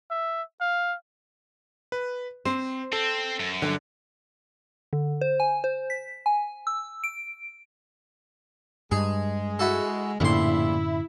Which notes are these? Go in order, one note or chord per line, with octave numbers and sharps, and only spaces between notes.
E5
F5
B4
C4 C5
C4 A4
F#2
D3 D#3 F#3 D4
D3
C5
G#5
C5
B6
G#5
E6
D7
G2 G#3 G#4
E4 F#4 A4
A#1 F#2 A2 D3 E4 C6